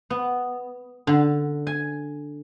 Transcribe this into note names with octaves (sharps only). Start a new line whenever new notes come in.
B3
D3
G#5